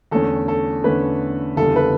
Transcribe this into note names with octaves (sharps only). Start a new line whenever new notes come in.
E2 D3 A3 C#4 A4
A4
E2 D3 A3 C#4 B4
F#1 E2 D3 G3 A4
B4